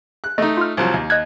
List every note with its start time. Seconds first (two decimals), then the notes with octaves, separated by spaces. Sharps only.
0.24 F#6
0.38 A3 D#4 D#5
0.57 F4 F6
0.77 C2 F3 F#3
0.94 D#2
1.10 D#5 F#6 G#6